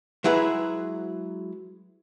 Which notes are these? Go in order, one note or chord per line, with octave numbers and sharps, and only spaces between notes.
F#3 G#3 E4 G#4 B4